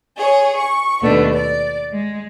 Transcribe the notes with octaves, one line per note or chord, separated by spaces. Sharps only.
G#4 C#5
C#6
D#2 B2 A3 B3 D4
D5
G#3